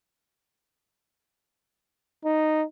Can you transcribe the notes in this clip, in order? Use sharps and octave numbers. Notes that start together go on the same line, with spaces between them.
D#4